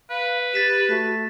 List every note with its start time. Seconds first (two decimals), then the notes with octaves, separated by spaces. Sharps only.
0.10 B4 F5
0.54 G4 A6 B6 E7
0.89 A3 F#4 B6